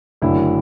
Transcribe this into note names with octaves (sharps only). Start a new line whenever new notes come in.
F#1 F#2 D3 A3 E4